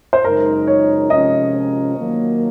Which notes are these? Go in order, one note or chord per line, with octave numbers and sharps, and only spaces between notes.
C5
F#2 C#3 G#3 D#4 A#4
C#5
C3 F3 G#3 C#4 D#5
D#3 F#3 A#3